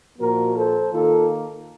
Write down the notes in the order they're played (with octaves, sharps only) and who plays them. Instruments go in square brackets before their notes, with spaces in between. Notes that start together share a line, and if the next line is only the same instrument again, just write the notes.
[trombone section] A#2 F3 A#3 F#4 A#4
A4 C5
D#3 A#3 F4 A4